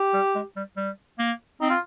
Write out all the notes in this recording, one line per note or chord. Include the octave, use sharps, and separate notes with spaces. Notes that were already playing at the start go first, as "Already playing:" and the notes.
Already playing: G4
G3
G#3
G3
G3
A#3
C4 D#4
F4